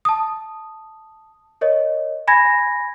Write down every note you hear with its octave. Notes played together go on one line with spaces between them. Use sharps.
A5 D#6
A#4 C#5 D#5
G#5 B5 G#6 A#6